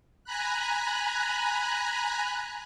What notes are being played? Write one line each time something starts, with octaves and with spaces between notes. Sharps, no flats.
G#5 A#5 B5 F#6